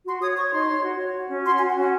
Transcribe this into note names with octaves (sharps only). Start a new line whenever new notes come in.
F#4 C6
C#5 D#6
C#5 C#6
D#4 C6
C#5
F#4
C#5
F#4
C#4
F#4 C6
G#5
F#4
F#5
C#4 G#5